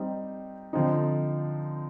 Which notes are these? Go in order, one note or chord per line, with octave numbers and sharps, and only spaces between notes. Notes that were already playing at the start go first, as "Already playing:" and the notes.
Already playing: G3 C4 D#4
D3 F3 C4 D#4